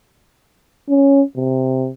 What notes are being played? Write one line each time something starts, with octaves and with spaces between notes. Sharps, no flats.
C#4
C3